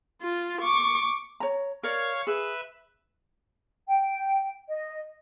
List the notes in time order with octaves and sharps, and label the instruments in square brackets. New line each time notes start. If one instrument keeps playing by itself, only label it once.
[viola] F4
C#6 D6
[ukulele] C#5 A#5
[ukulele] A#4 D5 [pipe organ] C#5 F5 G#6
[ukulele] G#4 [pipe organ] B4 E5
[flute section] G5
D#5